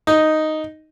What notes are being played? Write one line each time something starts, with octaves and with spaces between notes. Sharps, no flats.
D#4